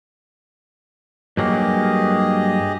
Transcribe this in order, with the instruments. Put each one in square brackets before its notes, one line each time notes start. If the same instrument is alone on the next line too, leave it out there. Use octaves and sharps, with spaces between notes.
[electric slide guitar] G2 F#3 A#3 [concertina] G4 G#4 D#5